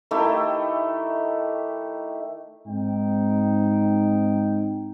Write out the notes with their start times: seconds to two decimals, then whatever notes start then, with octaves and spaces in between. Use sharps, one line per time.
0.11 D#3 A3 E4 G4
2.66 G#2 C4 D#4 G5